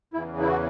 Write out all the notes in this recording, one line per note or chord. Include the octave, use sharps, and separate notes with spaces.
E2 C#3 E3 E4
E4
F#4